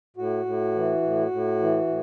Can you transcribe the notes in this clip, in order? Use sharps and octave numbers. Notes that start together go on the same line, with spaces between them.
A2 F#4
A2
E3
A2
A2
E3
A2